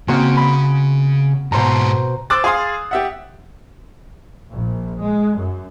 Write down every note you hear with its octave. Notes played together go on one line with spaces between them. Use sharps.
C#3 A#3 C4 F#4
B5
G#2 B2 A4 C5 A#5
C5 D6 E6 F#6 A6
G#4 F5 C6 D#6
G4 E5 F#5
A#1
G#3
F#2